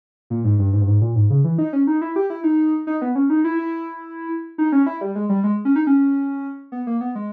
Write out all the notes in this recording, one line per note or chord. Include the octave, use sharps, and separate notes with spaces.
A#2
G#2
G2
G#2
G2
G#2
A#2
G#2
C#3
E3
D#4
C#4
D#4
E4
G4
E4
D#4
D#4
B3
C#4
D#4
E4
E4
D#4
C#4
E4
G3
G#3
G3
G#3
C#4
D#4
C#4
B3
A#3
B3
G#3